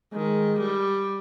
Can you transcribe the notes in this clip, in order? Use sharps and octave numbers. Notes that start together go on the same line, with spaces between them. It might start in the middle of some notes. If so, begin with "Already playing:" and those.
D#3 G#3
G3